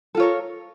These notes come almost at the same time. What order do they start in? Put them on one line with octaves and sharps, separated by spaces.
A4 F4 C#5 A#4